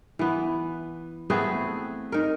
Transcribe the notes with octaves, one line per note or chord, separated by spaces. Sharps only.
E3 B3
A3 B3 C4 G#4
D#4 A#4